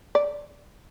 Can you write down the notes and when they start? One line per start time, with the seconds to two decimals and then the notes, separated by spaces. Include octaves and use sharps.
0.15 D5